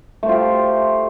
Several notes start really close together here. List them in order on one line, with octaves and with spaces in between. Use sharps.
A3 C5 F4 G4